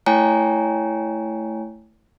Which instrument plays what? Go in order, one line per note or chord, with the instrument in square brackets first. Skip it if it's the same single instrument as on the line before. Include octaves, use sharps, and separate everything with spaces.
[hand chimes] A3 E4 C#5 G5 G#5 A#5